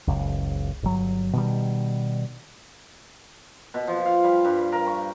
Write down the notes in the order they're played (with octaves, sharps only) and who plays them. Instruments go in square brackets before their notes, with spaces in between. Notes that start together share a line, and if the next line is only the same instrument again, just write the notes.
[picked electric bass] F#1 C#2
G1 F#3
B2 D#3 G3
[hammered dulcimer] B2
F3
F5
G3
G2
A#4
C#6